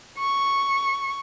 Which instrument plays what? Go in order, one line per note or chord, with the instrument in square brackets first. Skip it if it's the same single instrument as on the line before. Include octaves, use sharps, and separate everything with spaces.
[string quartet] C#6